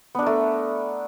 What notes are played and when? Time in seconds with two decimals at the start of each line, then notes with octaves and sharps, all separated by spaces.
0.15 B3
0.19 D4
0.23 A#4
0.26 A3